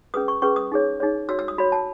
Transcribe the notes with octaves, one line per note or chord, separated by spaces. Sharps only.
C#4 G#4 B4 D#6
C#6
C#4 G#4 B4 C#6
D#6
D#4 G#4 C#5
D#4 G#4 C#5
F#4 C#5 E6
E6
D#6
F#4 C#5 B5
A5